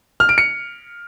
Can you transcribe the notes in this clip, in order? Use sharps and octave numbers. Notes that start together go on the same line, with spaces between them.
F6
D7
C#7